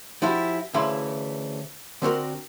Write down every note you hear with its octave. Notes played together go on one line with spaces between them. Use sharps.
F3 E4 F#4 G4
D2 C#3 E3 E4 C6
D3 C4 F#4 A#4